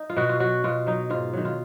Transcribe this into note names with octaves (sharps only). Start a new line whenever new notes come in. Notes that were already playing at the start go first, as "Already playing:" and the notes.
Already playing: D#4
F4
B2 F#4
F4
F#3 F#4
B2 F4
F#3 D#4
G#2 F4
D#3 F#3
F4